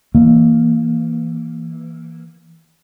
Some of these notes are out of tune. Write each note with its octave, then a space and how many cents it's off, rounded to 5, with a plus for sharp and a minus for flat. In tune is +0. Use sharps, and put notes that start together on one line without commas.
E3 +0 A#3 +0